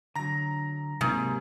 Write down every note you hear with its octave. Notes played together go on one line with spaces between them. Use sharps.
D3 F#3 A#5 A#6
G#2 C3 F#3 A#3